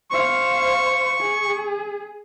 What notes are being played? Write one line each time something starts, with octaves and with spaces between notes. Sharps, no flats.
C5 F5 C#6
G#4